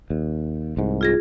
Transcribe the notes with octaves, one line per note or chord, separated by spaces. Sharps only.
D#2
C2 G#2
F4 G#4 A#6